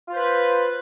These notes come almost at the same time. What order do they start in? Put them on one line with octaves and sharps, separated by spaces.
F4 C5 B4